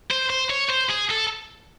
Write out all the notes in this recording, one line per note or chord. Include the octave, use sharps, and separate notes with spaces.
C5
C5
C#5
C5
G#4
A4